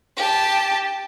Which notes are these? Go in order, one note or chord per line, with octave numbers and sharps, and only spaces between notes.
G4 A5